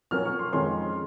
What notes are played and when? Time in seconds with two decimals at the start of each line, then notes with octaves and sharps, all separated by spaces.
0.11 A#2 F#3 A#3 C#4 F6
0.25 C#6
0.39 C6
0.53 F2 D#3 G#3 C#4 F4 C6